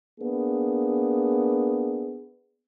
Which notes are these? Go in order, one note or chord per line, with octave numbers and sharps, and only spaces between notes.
A#3 B3 D4 G#4